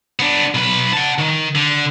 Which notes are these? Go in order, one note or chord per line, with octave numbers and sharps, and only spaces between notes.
B3 D4
B1 B4
F#5 A5
D#3
D3